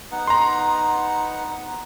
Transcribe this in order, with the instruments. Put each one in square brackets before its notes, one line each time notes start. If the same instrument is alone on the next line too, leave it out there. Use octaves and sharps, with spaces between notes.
[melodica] B3 D#4 F#5
[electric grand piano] A#5 C6